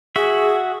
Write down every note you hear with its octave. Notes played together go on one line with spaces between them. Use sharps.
F#4 G#4 E5